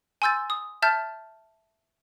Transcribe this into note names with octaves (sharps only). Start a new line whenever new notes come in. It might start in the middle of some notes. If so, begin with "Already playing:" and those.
G#5 C6 E6 G6 A6
D#6
E5 A5 F6 G6 A6